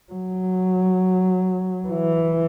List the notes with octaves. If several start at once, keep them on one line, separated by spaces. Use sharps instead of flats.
F#3
E3